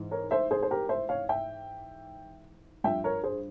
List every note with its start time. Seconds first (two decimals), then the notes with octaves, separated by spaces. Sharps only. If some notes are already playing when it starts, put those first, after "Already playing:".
Already playing: G#2 E3
0.11 A#4 C#5
0.31 C5 E5
0.51 G#4 C5
0.63 C5
0.71 G4 A#4
0.89 C5 E5
1.09 C#5 F5
1.29 E5 G5
2.84 G2 F3 E5 G5
3.04 A#4 C#5
3.23 G#4 C5